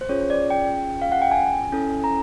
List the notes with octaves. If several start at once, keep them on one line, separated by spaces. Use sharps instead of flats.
C5
C#4 F4 G#4 C#5
D5
G5
F5
F#5
G5
G#5
C#4 E4 A4
A#5